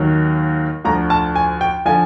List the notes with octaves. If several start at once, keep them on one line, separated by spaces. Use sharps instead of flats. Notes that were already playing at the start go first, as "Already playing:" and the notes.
Already playing: D#2 D#3 F#3
D2 D3 F3 A#5
A5
G#5
G5
D3 F3 G#5